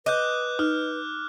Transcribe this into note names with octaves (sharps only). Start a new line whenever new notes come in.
B4 D#5 D6 F#6 G6
D#4 F6